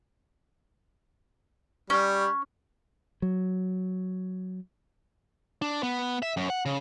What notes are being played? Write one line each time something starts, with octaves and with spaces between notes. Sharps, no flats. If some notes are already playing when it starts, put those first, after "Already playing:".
G3 C#4
F#3
D4
B3
E5
F#2
F#5
C#3